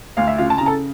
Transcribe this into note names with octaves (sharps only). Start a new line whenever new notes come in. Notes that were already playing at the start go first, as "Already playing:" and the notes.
D2 F5
E5
C#3 F4 F5
A5
C#3 A#5
A4 A5